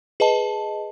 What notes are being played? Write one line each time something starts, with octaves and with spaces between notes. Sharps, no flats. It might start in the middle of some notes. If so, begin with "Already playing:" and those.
G#4 B4 D#5 A5